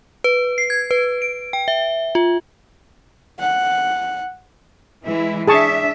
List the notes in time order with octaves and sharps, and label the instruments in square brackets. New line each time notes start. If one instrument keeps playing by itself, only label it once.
[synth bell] B4
C7
G#6
B4
D7
G5
E5
F4
[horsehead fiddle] F#5
[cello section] E3 G#3 E4
[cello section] D4 E5 [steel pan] G#4 A5 C#6